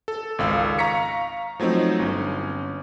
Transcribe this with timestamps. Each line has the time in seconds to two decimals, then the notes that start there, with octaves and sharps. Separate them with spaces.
0.08 A4
0.38 G#1 C#2 F5 E6
0.79 F5 A#5 C#6 B6 C#7
1.60 F3 F#3 A3 C4 D#4
1.99 G1 C#4